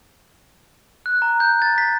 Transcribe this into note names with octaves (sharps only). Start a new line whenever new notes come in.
F#6
A#5
G6
A6
B6